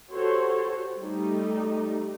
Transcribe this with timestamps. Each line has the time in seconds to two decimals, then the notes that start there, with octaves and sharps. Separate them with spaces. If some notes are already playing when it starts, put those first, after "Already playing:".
0.10 F#4 G4 A4 C5 C#5
0.98 G3 A3 D#4